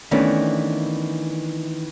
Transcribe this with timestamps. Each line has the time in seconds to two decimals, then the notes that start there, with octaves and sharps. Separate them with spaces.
0.11 D#3 E3 A3 B3 C#4 D4